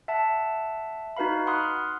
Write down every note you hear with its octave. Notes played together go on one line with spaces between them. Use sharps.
E5 F#5 A5
D#4 F#4 B4 F5 B5
F#5 B5 C6 D#6 F6 F#6